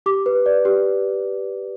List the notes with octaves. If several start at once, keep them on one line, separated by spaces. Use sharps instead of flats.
G4 D6
B4
D5
G4